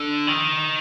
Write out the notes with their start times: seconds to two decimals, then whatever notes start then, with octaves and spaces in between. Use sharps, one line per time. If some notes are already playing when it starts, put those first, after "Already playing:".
Already playing: D3
0.27 D#3